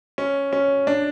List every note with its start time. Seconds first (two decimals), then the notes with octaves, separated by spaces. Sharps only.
0.18 C#4
0.53 C#4
0.87 D4